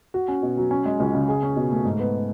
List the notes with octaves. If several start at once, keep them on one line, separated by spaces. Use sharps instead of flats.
F#4
C#4
B2
F#3
C#4
G#3
C#2
C#3
G#4
C#4
B2
A3
G#2
B3